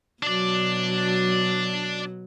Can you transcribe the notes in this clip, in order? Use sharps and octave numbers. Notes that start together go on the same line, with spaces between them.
B2 F#3 D4 D5